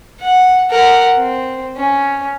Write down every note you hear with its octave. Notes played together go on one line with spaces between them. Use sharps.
F#5
A#4 F#5
C4
C#4